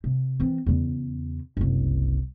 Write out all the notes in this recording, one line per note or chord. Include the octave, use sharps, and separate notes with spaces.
C3
E3 C4
E2 C#3
F#1 C2